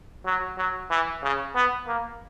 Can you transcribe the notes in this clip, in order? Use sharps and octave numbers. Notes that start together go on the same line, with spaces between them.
F#3
F#3
E3
C#3
B3
A#3